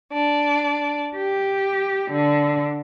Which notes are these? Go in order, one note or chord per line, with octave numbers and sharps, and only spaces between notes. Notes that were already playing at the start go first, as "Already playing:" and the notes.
D4
G4
D3